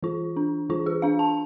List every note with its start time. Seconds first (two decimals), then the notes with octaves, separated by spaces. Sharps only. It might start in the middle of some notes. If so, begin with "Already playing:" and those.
0.03 E3 F4
0.36 D4
0.69 E3 F4
0.86 G#4
1.02 D4 F5
1.19 A5